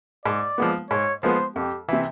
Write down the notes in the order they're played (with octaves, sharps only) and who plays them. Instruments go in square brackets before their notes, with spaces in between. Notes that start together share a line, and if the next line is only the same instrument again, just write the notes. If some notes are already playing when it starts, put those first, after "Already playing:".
[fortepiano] G#2 [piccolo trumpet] D5
[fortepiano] F3 G#3 B3
[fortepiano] G#2 [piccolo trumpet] C#5
[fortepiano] F3 G#3 B3 [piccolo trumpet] C5
[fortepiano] F2 [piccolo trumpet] G4
[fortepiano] C3 E3